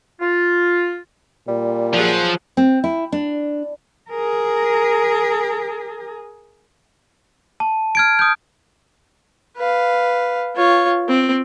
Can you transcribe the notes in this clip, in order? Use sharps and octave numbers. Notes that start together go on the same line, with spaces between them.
F4
A#2 G3
F3 F#3 G#4 F#5
C4
E4
D4
G#4 A#4
A5
F6 G#6 D7
D#6 G6
B4 F5
F4 C#5
C4